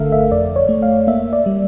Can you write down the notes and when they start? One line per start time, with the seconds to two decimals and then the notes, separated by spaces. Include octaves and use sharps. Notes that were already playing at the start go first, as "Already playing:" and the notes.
Already playing: G1 D3 A3 A4 A#4 E5 F5
0.12 E5
0.31 F2 D5
0.56 C#5
0.69 A3
0.82 F5
1.07 A#3 E5
1.33 D5
1.46 G3